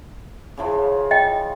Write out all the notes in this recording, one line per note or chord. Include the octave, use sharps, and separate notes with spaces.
C#3 E3 F3
D#5 G5